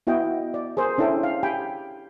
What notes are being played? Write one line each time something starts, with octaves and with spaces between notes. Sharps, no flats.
B3 E4 F#4 D#5 G5
D5
G#4 A#4 C5
C#4 D4 E4 A4 E5 G5
F5
G4 G5 G#5 B5